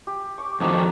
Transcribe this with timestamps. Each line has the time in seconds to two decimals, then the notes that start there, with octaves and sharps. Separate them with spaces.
0.07 G4
0.38 C#6 D6
0.60 F2 D#3 F3 D4 D#4 F#4